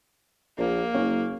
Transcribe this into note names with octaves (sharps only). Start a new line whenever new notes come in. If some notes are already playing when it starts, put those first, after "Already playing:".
A#1 A#3
F#1 C#4 C#5